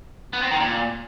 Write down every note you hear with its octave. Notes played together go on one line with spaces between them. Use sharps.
B3
C4
D#3
A#2